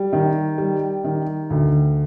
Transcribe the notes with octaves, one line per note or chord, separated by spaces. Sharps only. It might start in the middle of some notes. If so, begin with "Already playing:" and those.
Already playing: G3
D#3
G3
D#3
D2